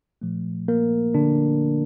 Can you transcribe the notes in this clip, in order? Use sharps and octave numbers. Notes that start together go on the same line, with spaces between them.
A#2 F3 A3
A#3 A#4
D3 D4